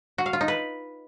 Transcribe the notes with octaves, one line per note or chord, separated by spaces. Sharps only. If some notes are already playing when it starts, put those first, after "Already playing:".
F#4
F5
F4
D#4
B4